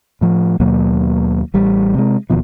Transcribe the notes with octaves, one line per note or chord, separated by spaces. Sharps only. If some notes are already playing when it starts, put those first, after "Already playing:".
A2 F3
D#2 B2 F#3 A#3
A1 G3
C3 G#3
E1 D#2 B2 F3